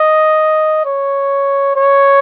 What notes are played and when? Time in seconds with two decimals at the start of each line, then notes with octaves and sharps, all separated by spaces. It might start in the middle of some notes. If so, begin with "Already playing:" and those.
Already playing: D#5
0.85 C#5
1.76 C#5